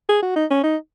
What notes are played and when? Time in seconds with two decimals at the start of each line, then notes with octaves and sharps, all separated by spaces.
0.09 G#4
0.22 F#4
0.36 D#4
0.50 C#4
0.63 D#4